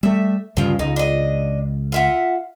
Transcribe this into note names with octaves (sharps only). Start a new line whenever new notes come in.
G3 A3 E5
D2 G2 C#3 F3 F4
C#2 D#4
D4 D#5
F4 E5 F#5